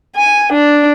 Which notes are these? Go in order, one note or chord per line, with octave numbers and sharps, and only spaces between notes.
G#5
D4